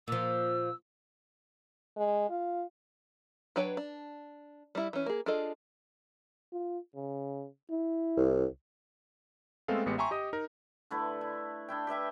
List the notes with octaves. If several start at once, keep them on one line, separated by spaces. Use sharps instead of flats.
A#2 F3 E6
G#3
F4
F#3 D4 B4 C#5 G5
D4
G3 E4
E3 C#4
A#3 G#4
D4 F4 G#4 A4 D#5
F4
C#3
E4
C2
G#3 A3 B3 C4 A4 F5
A1 G#3 B3 G4 C#7
E5 G5 G#5 A#5 C6 C#6
G4 D#5 D#6
D#4 A#4
D3 A3 E4 B4
E4
D4 E4 G5
G4 B4 E5 G5